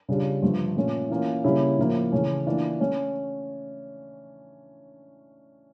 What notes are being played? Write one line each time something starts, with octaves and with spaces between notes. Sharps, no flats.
C#3 G3 D4 F4
G2 D3 F3 A3
A#2 A3 C#4
E3 A#3 C#4 F4
C#3 G3 A#3 C#4 E4
A2 F3 A#3 E4
C#3 E3 A3 C#4
E3 A#3 D4 F4
A3 C#4